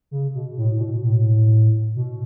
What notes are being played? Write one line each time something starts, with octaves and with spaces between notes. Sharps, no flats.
C#3
B2
A2
A2
B2
A2
B2